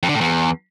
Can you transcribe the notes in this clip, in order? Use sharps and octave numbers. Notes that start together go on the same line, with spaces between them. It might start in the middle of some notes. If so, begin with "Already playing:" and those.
F2
D3
A2
E2